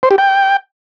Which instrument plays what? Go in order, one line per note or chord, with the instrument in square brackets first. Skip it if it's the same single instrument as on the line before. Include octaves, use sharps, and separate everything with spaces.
[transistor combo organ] C5
G4
G5